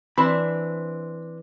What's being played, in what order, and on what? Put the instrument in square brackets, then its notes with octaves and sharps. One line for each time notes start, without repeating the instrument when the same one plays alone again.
[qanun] E3 E5 [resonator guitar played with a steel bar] C4 D4 C5 [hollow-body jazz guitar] B5